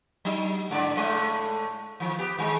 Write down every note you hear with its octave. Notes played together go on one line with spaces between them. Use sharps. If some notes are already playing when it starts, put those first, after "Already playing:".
F#3 D#4
G#2 D3 D5
A2 G#3 A3
D#3 F3
B3 G4
A2 D#3 G#3